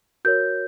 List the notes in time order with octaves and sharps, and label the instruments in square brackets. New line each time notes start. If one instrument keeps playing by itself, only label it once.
[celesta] F#4 A#4 C#5 G6